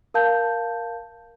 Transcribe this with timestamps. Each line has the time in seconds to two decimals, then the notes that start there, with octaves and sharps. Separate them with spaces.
0.14 A#4 F5 A5 G6